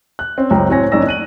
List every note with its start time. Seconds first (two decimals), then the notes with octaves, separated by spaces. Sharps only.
0.19 F#6
0.38 C4 C#4
0.50 C#2 F#2 C5 G5 A#5
0.69 A2 F#3 C4 C#5 G#5 A#6
0.92 F#1 C#4 D#4 D5 E6 A#6
1.07 F#6 D#7 F#7